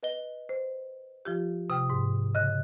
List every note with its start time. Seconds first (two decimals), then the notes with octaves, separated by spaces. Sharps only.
0.03 B4 D#5 G7
0.49 C5
1.25 F3 F4 G4
1.70 C3 G5 D#6 F6
1.90 G#2
2.35 C#3 D#5 F#6